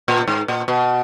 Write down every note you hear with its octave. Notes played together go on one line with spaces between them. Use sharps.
A#2
G#2
A#2
B2